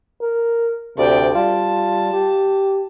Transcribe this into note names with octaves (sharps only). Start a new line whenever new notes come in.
A#4
D2 C3 D5 G5
G3 F4 A5
G4